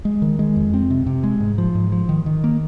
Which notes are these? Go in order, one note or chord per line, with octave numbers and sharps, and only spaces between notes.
G#3
D#3
G#3
F2
C4
C3
C3
G#3
G#2
F3
G#2
F3
D#3
D#3
A#3